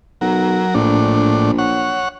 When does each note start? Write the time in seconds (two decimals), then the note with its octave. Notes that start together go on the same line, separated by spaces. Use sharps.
0.21 B1 F#3 A#4
0.75 A#1 A2 D4
1.58 C#5 F#5